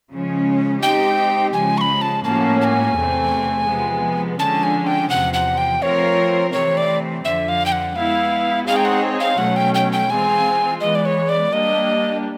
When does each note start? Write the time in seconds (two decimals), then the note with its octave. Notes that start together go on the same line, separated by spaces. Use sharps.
0.10 C#3 F3 G#3 C#4
0.82 G#3 C4 D#4 G4 G5
1.53 C#3 F3 G#3 G#5
1.78 C#6
1.81 B5
2.02 A5
2.24 A2 F3 A#3 C#4 F#4 A5
2.61 A5
2.64 G#5
2.97 E2 C3 E3 A3 C4
3.67 C3 F3 G#3 B3
4.39 D3 F3 G#3 C#4 A5
4.63 G#5
4.87 G5
5.10 E2 C3 F3 F#5
5.34 F#5
5.57 G5
5.82 F3 A3 C4 F4 A#4 C#5
6.52 C3 E3 A3 C4 C#5
6.77 D5
7.24 F2 D3 F3 E5
7.48 F5
7.66 G5
7.72 F#5
7.96 G#3 B3 E4 F5
8.67 G#3 C4 D#4 G#4 C#5 F5
8.76 G5
8.85 F#5
9.20 F5
9.38 B2 F#3 A3 C#4 F#5
9.56 G5
9.75 G5
9.92 G5
10.10 E3 G#3 C4 F4 G#5
10.81 E3 G#3 B3 D#5
10.95 D5
11.05 C#5
11.29 D5
11.53 G3 A#3 D4 G4 D#5